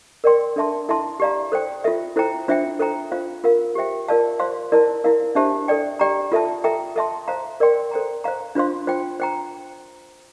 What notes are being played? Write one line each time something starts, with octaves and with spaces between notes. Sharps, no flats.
A#4 D5 G5 C6
D4 A4 E5 A5 C6
E4 A4 E5 A5 C6
G4 D5 F5 A#5
A4 C5 G5
F4 A4 E5
E4 A4 C5 G5 A#5
D4 F4 C5 E5 G5
A4 C5 G5 A#5
F4 C5 F5
F4 A#4 F5
G4 C5 E5 G5
F4 A#4 D5 F5 A5
C5 F5 C6
E4 A#4 D5 A5
E4 A#4 F5
D4 G4 C5 E5 A5
A4 D5 G5
G4 D5 G5 A#5
F4 A4 E5 A5
A4 E5 G5 A#5
A4 E5 A5 C6
C5 F5 A#5
A#4 D5 G5 C6
A4 C5 G5 A#5
C5 F5 A#5
D4 F4 C5 F5 C6
F4 C5 G5
C5 G5 A#5